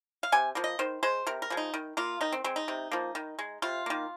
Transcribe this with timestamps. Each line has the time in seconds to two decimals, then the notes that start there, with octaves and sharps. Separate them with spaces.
0.23 F5
0.32 C3 G#5
0.55 F3 A#3
0.64 D#5
0.79 D#3 C5
1.03 G#3 C5
1.27 C3 A#4
1.42 A#4
1.50 F3 G#3
1.57 D#4
1.74 D#3
1.97 A#3 F4
2.21 D#3 D#4
2.32 C4
2.44 G#3 C4
2.56 D#4
2.68 C3
2.92 F3 A#3
3.15 D#3
3.39 G#3
3.62 C3 F4
3.86 D#3 A#3